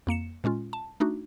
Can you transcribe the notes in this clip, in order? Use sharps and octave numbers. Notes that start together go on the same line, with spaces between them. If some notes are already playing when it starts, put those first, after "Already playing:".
F2 A#3 C#7 E7
A#2 G#3 C#4 F4
A5
A3 D4 D#4 F#4